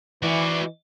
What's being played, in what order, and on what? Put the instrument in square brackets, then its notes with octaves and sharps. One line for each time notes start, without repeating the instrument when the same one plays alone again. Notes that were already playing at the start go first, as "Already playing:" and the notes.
[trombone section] E3 [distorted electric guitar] F#4 D5